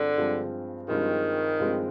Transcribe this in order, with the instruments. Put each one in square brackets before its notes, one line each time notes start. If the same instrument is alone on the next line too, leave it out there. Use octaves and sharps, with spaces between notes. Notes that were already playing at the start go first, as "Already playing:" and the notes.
Already playing: [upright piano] G2 F3 G#3 C4 [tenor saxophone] D3
[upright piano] G2 F3 G#3 C4
[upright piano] G2 F3 G#3 C4 [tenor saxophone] D#3
[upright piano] G2 F3 G#3 C4